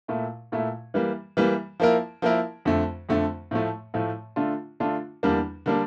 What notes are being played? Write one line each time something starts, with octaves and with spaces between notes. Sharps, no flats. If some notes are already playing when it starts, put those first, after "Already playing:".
A#2 A3 E4
A#2 A3 E4
E3 G3 A#3
E3 G3 A#3
F3 A#3 E4 A#4
F3 A#3 E4 A#4
F2 D3 A3
F2 D3 A3
A2 F3 A3
A2 F3 A3
D3 A3 D4 F4
D3 A3 D4 F4
E2 D3 G3 A#3 D4
D3 G3 A#3 D4